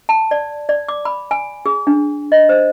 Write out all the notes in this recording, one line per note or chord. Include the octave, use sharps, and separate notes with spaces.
A5
D5
D5
D6
B5
G#5
G#4
D4
D#5
C5